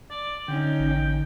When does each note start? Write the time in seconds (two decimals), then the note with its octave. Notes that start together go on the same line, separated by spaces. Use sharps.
0.10 D5
0.48 D3 C#4 D#4 G5
0.80 A1